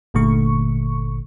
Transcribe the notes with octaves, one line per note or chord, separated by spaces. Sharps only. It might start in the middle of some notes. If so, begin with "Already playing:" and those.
G1 A#2 D3 A3 C#6